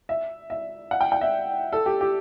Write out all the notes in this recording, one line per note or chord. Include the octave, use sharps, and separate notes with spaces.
E5
E5
F#5
G5
G5
E5
A4
G4
G4